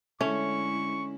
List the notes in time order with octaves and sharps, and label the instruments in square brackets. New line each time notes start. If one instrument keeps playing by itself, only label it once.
[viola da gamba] D3 G#3 E4 [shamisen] A3 [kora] C#4 [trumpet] C#6